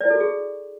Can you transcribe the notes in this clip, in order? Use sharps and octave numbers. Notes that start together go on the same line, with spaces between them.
E4 F#4 G#4 A4 D5